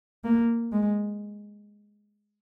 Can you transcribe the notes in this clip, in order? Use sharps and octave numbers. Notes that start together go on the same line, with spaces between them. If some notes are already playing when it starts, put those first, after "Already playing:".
A#3
G#3